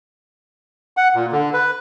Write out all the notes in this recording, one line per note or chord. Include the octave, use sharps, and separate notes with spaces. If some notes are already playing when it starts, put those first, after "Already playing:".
F#5
A#2
D3
B4